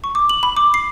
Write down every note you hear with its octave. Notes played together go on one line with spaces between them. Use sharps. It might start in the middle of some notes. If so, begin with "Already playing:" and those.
C#6
D6
F#7
B5
D6
C7